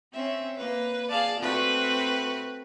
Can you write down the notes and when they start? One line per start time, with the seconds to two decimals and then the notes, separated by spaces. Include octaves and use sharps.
0.14 C4 C#4 E5
0.58 A#3 B4
1.09 G#4 D5 F5 A5
1.40 A3 C4 F#4 B4